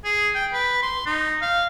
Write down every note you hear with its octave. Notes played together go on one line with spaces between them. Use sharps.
G#4
G5
B4
C6
D#4
F5